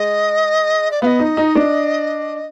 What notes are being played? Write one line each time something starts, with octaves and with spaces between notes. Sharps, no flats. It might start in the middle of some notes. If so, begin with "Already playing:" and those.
Already playing: G#3 D#5
D5
B3 D#5 F5
D#4
D#4
D4